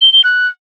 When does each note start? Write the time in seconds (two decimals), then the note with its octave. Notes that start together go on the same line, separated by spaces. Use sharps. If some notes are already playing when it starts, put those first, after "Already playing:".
0.01 G7
0.13 G7
0.24 F#6